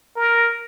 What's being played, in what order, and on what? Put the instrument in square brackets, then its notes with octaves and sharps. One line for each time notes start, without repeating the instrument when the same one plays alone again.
[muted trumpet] A#4